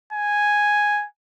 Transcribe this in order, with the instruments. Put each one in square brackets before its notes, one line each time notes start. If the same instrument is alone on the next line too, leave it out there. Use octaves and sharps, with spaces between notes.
[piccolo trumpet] G#5